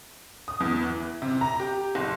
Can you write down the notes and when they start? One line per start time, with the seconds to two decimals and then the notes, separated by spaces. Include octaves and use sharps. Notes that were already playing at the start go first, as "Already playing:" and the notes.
0.48 D#6
0.60 E2
0.81 E3
1.22 C3
1.41 A#5
1.60 G4
1.95 F#1